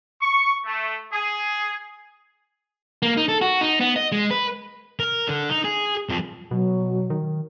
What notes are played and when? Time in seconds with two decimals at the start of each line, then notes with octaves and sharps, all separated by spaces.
0.21 C#6
0.66 A3
1.13 G#4
3.02 A#3
3.17 D#4
3.28 A4
3.41 F#4
3.61 D#4
3.80 B3
3.96 D#5
4.12 G#3
4.30 B4
4.99 A#4
5.28 D3
5.49 D#4
5.64 G#4
6.09 F2
6.51 B2 F#3
7.10 D#3